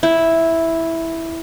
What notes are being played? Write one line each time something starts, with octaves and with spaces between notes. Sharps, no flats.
E4